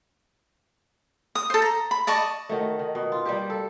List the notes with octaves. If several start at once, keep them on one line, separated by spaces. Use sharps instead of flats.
D#6
A4 C5
A#5
B5
D5 D#5 A5 C#6
D#3 F#3 A3
D#3
B2
F4
G3 A#3 G4
A4